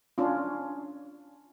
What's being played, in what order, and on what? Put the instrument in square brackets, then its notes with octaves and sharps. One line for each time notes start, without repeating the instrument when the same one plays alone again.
[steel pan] C#4 D4 F4